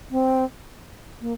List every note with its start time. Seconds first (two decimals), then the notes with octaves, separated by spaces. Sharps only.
0.11 C4
1.21 A#3